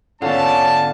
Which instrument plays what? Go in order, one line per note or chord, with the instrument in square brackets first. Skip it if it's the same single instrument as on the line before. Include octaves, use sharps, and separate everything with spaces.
[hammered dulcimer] D3 [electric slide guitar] B3 F4 [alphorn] C#4 [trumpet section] A5